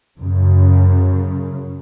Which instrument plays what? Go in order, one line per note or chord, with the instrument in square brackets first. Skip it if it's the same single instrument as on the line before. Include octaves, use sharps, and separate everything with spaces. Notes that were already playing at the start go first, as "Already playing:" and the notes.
[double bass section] F#2 C#3